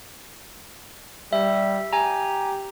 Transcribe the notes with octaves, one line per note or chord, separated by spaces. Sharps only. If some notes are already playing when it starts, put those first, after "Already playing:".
G3 E5
G4 G#5 A#5